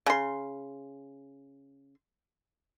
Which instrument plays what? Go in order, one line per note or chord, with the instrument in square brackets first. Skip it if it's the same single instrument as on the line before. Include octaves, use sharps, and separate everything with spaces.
[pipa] C#3 C6